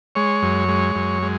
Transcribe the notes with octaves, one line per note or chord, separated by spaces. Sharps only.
G#3 C#5
F#2
G#3
F#2
G#3